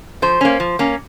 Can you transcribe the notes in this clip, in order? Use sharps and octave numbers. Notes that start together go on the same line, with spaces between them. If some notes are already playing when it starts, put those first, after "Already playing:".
F3 C5
A#3 C#4
F3
A#3 C#4